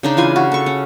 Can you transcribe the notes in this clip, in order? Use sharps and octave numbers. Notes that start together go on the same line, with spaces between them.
C#3 D4 D#4
E3 F4 G#5
F#4
A4 C#6
C#4